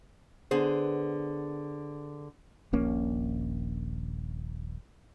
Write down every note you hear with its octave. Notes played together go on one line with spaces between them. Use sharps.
D3 B3 G#4 C5
D#1 A#1 A#3 C#4